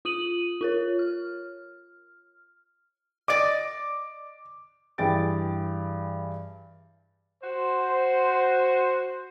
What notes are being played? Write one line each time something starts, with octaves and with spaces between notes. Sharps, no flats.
F4 D#6 D#7 F#7
F4 A#4 C#5
F6
D5 D#5 D6 D7
G2 E3 G#4 G5 A6 D7
F#4 C5